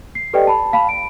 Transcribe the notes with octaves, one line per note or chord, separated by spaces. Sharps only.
C7
G4 A4 B4 D5 D#5 G5
A5 B5
F5 A5 B5
D7